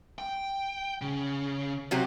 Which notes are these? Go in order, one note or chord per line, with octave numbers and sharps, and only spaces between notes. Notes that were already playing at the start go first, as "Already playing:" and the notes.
G5
C#3
C3 F#3 G4